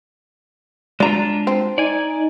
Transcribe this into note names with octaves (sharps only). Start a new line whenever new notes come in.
G#3 D4 F4 D5 A#5
C4
D#4 D5 G#5